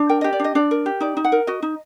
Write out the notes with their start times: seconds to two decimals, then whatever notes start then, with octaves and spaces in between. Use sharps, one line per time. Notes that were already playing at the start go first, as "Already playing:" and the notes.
Already playing: D4
0.09 A#4 G5
0.21 D#5
0.24 G4
0.33 D5
0.40 D4 D#5
0.55 D4 D5
0.71 A#4
0.86 G4
1.01 D#4 D5
1.17 D#4
1.24 F#5
1.32 A#4
1.47 F#4 D#5
1.62 D#4